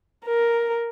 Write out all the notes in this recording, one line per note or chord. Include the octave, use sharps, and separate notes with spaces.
A#4